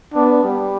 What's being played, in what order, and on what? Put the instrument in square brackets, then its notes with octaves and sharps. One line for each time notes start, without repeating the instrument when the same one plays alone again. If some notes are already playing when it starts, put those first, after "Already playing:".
[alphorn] B3 [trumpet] D4
[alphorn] G3